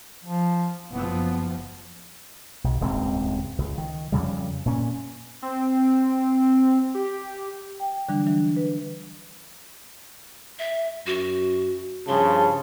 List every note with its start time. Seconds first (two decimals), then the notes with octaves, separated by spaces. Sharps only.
0.24 F3
0.91 F#1 F3 B3
2.64 B1
2.81 D#1 C#2 G#2 C4
3.58 C#2
3.78 D#3
4.12 F2 C#3 G3
4.66 A#2 C#4
5.42 C4
6.94 G4
7.80 G5
8.09 D3 E3 F#3 G3 D4
8.27 E3 F#3 D4
8.56 B4
10.59 E5
11.06 F#2 F#4
12.08 G2 C#3 F3 A5 C6